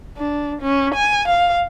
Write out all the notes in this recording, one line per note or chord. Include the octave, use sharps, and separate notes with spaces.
D4
C#4
G#5
F5